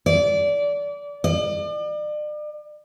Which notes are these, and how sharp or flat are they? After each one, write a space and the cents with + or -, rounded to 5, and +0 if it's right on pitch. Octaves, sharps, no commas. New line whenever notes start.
D5 -25
D5 +40